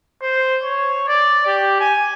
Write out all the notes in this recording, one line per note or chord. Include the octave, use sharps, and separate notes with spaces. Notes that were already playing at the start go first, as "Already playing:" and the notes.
C5
C#5
D5
G4
G#5